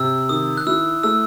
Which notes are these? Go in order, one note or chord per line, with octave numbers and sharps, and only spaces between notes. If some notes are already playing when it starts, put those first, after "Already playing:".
Already playing: C3 E6
D#3 D#6
F#6
E4 E6
A3 E6